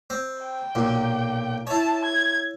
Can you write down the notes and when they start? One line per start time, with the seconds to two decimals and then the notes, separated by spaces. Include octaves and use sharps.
0.10 C4
0.42 G5
0.75 B1 A#2
1.67 E4 C#5 A5
2.05 G#6